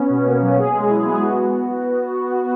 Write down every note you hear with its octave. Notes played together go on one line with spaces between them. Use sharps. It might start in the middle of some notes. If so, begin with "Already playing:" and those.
Already playing: B3 C#4
B2
A#3
F#3
G#4
G#3
E4
B3
F#4